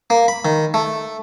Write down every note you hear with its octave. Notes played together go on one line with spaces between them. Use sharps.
A#3
B5
D#3
A3